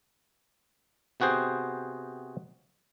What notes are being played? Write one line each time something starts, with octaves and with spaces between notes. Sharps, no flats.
C3 B3 F#4 G#4 C5 G5